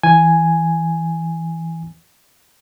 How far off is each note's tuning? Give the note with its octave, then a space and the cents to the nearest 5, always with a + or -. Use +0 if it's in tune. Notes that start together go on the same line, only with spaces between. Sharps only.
E3 -5 G#5 +0